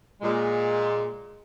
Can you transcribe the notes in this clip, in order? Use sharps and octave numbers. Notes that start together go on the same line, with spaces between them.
A#2 G#3